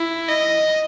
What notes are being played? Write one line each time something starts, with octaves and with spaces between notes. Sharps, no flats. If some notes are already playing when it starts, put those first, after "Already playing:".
Already playing: E4
D#5